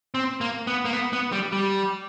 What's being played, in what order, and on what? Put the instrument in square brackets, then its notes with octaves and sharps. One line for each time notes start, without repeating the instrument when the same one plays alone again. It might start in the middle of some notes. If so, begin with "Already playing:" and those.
[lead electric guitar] C4
A#3
B3
A#3
B3
B3
G3
G3